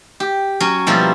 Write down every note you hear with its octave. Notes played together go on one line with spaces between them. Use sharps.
G4
F#3 C#4
B2 F3 G3 A#3 E4 F4